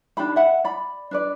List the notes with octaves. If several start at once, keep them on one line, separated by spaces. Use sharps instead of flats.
D4 D#4 G4 B5
E5 F#5
D5 B5
D4 B4 D5